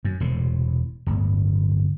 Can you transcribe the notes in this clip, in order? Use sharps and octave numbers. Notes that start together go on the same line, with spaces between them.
F#2
E1 A2 C3
D1 G1